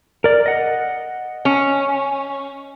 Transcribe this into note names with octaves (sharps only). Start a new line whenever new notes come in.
A#4 D5
D#5 F#5
C#4